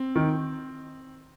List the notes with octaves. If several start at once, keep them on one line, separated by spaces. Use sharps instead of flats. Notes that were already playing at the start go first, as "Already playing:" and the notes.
Already playing: C4
D#3